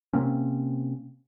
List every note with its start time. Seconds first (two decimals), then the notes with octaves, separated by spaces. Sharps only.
0.13 C3 A#3 C4 C#4